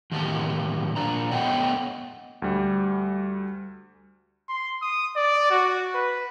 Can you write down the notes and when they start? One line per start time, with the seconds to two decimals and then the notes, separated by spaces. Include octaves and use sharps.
0.12 E2 A2 D#3 G4 A5
0.96 A#2 D4 A#5
1.31 A3 B3 C#5 D#5 F#5 G5
2.42 D2 G3
4.49 C6
4.82 D#6
5.16 D5
5.51 F#4
5.95 B4